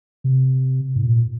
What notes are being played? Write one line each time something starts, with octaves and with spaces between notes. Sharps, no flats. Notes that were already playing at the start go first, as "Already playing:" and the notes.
C3
G#2
A#2